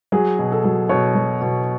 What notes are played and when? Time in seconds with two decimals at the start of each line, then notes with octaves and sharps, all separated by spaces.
0.12 F#3 G#4
0.39 B2
0.52 A4
0.64 F#3
0.89 B2 C#5
1.15 F#3
1.42 B2